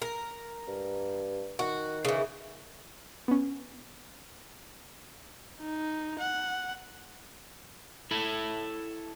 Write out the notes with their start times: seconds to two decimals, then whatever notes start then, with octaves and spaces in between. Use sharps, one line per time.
0.02 A#4
0.68 G2
1.59 D#3 F#4
2.05 C#3 E3
3.28 B3 C#4
5.60 D#4
6.20 F#5
8.11 E4 A4 E5 B5